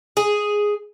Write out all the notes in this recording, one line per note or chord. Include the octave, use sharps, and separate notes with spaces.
G#4